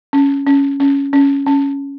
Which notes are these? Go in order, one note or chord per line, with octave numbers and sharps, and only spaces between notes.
C#4
C#4
C#4
C#4
C#4